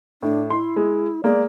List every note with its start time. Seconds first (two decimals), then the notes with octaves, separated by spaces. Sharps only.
0.23 A2 D4
0.50 E4 C6
0.76 G#3
1.24 G#3 A#3 D5